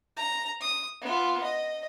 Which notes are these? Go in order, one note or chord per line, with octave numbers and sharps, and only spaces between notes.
A#5
D#6
B3 F4
D#5